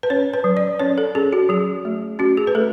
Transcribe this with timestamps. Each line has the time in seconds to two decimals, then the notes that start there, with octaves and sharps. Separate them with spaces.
0.03 B4
0.10 C#4 C#5
0.34 B4
0.44 F#3
0.57 D5
0.79 C#4 C#5
0.98 A4
1.15 C#4 G#4
1.33 F#4
1.49 F#3 G#4
1.85 A3
2.19 C#4 F#4
2.37 G#4
2.47 B4
2.55 A3 A4